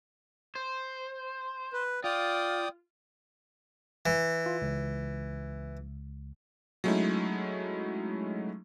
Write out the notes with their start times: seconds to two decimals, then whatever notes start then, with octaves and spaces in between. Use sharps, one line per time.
0.55 C5
1.73 B4
2.04 F4 D5 G5 D#6
4.06 E3
4.46 F4
4.62 C#2
6.84 F#3 G#3 A3 C#4 D#4 E4